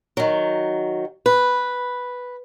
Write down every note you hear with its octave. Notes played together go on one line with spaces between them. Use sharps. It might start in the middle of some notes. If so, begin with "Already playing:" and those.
D#3 F#3
B4